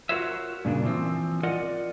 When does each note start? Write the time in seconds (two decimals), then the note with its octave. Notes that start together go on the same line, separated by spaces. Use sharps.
0.09 F4 F#4 A#4 C5 C#5 E5
0.65 G2 A#2 C#3 D4
0.83 E3 F3 C4
1.43 F4 A#4 D5 D#5 F#5